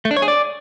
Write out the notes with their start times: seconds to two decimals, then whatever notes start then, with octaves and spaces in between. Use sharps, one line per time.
0.05 A3
0.11 D4
0.17 C#5
0.22 G#4
0.28 D5